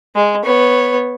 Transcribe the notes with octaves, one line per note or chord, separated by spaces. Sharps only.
G#3
B3 C#5